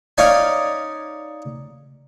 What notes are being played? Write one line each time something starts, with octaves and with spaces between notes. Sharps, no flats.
C#4 D#4 D5 F5 G#5